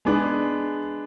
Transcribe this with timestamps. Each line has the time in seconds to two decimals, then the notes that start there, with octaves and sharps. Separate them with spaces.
0.05 G#3 B3 D4 G#4